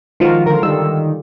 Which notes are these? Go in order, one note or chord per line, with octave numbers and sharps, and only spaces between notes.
D#3 F3 G#3 F4 F#4 A#4
D3 F4 A#4
D#3 G3 A4 E6